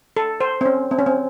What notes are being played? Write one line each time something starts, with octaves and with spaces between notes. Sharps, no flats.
A4
C5
C4
C#4
C4
C#4
C4